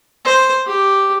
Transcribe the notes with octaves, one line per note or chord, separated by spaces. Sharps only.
C5
G4